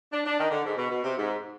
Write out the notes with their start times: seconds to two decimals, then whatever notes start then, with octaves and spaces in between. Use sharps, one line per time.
0.12 D4
0.25 D4
0.39 D#3
0.51 D3
0.65 G#2
0.77 B2
0.90 B2
1.04 C3
1.17 G#2